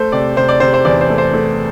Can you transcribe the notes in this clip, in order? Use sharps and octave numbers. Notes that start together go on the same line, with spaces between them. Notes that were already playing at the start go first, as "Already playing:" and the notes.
Already playing: A3 C5
C3 D5
C3 C5
D5
C3 C5
C5
E2 D5
C5
A3
C5
A3